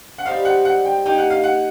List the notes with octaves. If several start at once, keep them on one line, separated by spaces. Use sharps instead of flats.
F#5
G3 C4 D#4 G4 F5
F#5
F#5
G5
A#3 D#4 G4 G5
F#5
F5
F#5